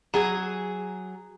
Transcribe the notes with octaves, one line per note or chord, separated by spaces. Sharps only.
F#3 G#4